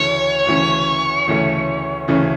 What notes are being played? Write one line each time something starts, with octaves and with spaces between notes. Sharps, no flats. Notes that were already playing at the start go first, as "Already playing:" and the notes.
Already playing: D2 C#3 E3 A3 C#4 C#5
D2 C#3 E3 A3 C#4
D2 C#3 E3 A3 C#4
D2 C#3 E3 A3 C#4